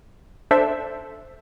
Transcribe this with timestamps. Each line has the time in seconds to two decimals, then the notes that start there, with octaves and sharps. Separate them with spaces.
0.51 D4 A4 C5 E5